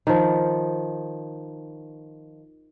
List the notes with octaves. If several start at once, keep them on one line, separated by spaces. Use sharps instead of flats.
D#3 F3